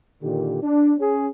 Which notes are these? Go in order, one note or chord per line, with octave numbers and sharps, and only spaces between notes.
A#2 D3 D#3 G4
D4
C#4 G#4